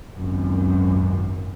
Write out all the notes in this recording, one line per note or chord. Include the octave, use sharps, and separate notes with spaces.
G#1 C#2 F#2 A#2 F#3